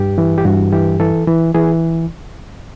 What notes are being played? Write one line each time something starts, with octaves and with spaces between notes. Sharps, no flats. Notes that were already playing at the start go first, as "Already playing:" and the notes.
Already playing: G2 G4
E3
G4
G2 F#4
E3 G4
E3 A4
E3
E3 G#4